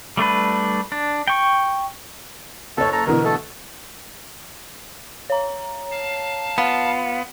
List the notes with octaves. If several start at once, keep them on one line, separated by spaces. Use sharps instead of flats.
G3 A3 D4 B4
D4
G5 C#6
F#1 A4 C#5
A4 A#5
B2 D3 E3 A#4
A3 A4
C#5 A#5
F5 A5
B3 F4